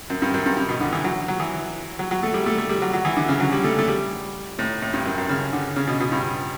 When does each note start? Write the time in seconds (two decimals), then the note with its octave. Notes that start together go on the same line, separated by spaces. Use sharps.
0.10 F#2
0.22 G2
0.34 F#2
0.46 G2
0.57 G2
0.69 B2
0.81 D3
0.93 E3
1.04 F#3
1.28 F#3
1.40 E3
1.99 F#3
2.11 F#3
2.23 A3
2.34 G3
2.46 A3
2.58 A3
2.69 G3
2.82 F#3
2.93 F#3
3.05 E3
3.17 D3
3.29 C#3
3.40 F#3
3.52 G3
3.64 A3
3.79 A3
3.88 G3
4.59 A2
4.82 A2
4.93 G2
5.06 F#2
5.18 F#2
5.29 C#3
5.53 D3
5.76 C#3
5.87 B2
6.00 B2
6.12 G2